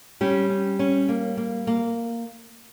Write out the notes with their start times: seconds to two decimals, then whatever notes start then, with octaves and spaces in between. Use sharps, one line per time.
0.21 G3 C#4 G4
0.50 C#4
0.79 C#4
1.09 A#3
1.37 A#3
1.67 A#3